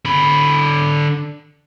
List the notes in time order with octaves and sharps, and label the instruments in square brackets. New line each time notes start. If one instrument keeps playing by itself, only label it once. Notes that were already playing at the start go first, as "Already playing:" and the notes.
[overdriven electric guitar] D3 B5